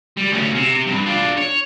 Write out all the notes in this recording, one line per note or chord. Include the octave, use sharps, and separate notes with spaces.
G3
D2 C#4
C3
G2
D4 F4
C#5